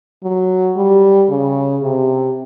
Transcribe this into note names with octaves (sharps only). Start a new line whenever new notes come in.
F#3
G3
C#3
C3